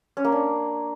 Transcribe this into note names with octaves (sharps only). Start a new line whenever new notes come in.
C#4
A#3
D4